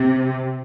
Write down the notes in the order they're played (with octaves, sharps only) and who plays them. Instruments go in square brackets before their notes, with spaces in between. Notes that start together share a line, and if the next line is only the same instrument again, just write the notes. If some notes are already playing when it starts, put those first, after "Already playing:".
Already playing: [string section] C3